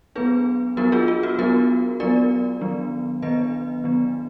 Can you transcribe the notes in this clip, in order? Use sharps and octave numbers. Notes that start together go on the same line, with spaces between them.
F#3 B3 D4 G#4 B4
F#3 B3 D4 F#4 A#4
F4 G#4
F4
F#4
F#3 B3 D4 F#4 A#4
F#3 B3 D4 A#4 D5
D#3 F#3 B3 D4
D#3 F#3 B3 D4 B4 D#5
D#3 F#3 B3 D4